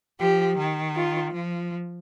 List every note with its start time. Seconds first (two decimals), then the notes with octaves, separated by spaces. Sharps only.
0.19 F3 G4
0.58 D#3
0.96 F4
1.33 F3